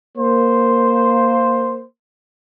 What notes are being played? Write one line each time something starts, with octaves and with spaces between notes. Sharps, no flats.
A#3 C5